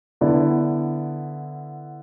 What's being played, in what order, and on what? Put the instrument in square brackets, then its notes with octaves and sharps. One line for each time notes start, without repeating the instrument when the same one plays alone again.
[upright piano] D3 B3 E4 D5